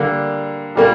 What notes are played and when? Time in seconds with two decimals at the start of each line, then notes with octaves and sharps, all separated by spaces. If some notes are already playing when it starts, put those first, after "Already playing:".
Already playing: D3 G3 A#3
0.75 A#2 G3 A#3